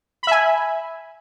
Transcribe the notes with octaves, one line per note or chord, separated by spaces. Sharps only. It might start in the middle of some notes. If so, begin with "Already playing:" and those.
E5 G#5 B5